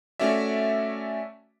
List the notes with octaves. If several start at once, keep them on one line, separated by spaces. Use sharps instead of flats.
A3 C#4 F#4 D5 E5